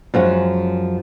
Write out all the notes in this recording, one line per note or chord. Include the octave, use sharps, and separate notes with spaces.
F#2 F3 G#3 C#4